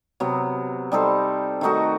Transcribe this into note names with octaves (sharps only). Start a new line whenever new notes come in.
C3 F#3 B3
G3 D#4 A4 C5
D#3 A3 D#4 F#4